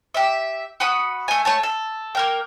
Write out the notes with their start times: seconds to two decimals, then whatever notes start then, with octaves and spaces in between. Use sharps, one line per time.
0.14 G4 E5
0.80 F#4 F#5 B5 D#6
1.28 A3 G#5
1.45 A3 C#5 A5
1.63 A4
2.15 A#3 A#4 G5